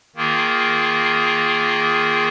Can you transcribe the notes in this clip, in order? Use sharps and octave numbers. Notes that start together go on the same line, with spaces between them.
D#3 A#3 F4 G#4